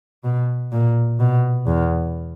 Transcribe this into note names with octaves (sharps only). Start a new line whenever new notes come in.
B2
A#2
B2
E2